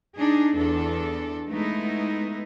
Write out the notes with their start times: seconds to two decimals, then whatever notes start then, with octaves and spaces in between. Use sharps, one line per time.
0.17 D4 D#4 G#4
0.55 E2 D4 A4
1.48 G#3 A3 B3 D#4 E4